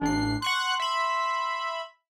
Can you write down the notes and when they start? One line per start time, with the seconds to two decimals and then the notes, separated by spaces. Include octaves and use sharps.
0.02 A1 D4 C7
0.42 F#5 C6 C#6 F#6
0.80 E5 B5